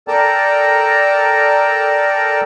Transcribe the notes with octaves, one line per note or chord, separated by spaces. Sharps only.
A4 A#4 D5 G5 A5 A#5